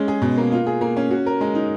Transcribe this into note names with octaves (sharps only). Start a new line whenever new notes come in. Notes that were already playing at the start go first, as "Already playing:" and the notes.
Already playing: G#3 C#4
G#4
B2
A#3
F4
G#4
A#3
C#4
F#4
A#4
G#3
D#4